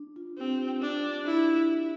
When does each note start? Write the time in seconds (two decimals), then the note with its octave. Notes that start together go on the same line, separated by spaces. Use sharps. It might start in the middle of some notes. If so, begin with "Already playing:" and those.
Already playing: D4
0.16 F4
0.38 C4 G4
0.82 D4
1.26 E4